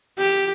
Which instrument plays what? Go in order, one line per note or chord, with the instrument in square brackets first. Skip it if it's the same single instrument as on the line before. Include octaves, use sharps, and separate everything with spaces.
[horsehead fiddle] G4